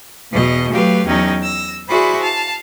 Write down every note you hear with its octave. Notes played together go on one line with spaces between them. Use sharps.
E2 B2 D#5
F#3 A3 G4 B4 F5
E2 F#3 C#4 D#4 G5
E6 A#6
E4 F#4 G#4 C5 D5 B5
F5 A5